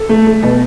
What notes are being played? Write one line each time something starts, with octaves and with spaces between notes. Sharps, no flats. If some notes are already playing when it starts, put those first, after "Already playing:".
Already playing: A4
A3
A3
B2